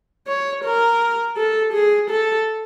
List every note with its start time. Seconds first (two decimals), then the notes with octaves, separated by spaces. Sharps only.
0.28 C#5
0.64 A#4
1.37 A4
1.73 G#4
2.10 A4